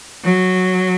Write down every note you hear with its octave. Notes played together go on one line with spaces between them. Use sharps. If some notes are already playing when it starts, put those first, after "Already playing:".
F#3